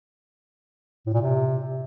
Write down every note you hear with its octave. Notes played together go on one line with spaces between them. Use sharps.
A2
A#2
C3